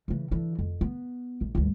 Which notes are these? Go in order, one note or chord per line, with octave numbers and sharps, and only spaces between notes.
C#3 E3
D3 E3
F2
B3
A#1
D2 G2